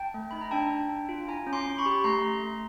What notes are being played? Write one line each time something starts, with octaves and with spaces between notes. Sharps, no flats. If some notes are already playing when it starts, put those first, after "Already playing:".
Already playing: G5 A5
A3
D#4 B5
A#5
D4 G5 A5
D4
D4
F4
E4 G#5 A#5
C#4
C6 D6
C#4
B5 C#6
G4
A3 A#5 C6
A3
A3